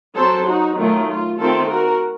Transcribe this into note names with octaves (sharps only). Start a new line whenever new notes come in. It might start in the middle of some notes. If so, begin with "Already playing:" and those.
F#3 C4 A4 C5
D#4 F#4
D#3 F#3 A3 F4
F4
D#3 A3 C4 F4 A4
F#4 A#4